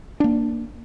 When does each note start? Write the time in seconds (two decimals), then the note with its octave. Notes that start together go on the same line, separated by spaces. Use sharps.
0.20 A#3 D4